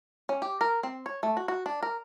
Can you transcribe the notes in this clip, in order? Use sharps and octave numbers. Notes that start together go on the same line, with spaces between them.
C#4
G4
A#4
C4
C#5
A3
F#4
F#4
D4
A#4